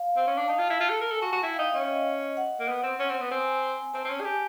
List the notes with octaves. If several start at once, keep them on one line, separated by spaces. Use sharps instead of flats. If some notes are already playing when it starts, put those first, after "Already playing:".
Already playing: F5
C4
C#4
D4
D#4 A5
F4
E4 A5
F4
A4
A#4
A4 G#5
F#4 A5
F#4
E4 G5
F5
D#4
E5
C#4 D#5
F#5
A#3
B3
C4
C#4
C4
B3
C4 G#5
C4 A5
C4
C#4
G#4
G4 G#5